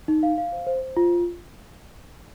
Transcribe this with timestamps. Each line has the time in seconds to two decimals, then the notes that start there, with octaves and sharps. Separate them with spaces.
0.08 D#4
0.23 F5
0.38 F5
0.52 C5
0.67 C5
0.82 C5
0.97 F4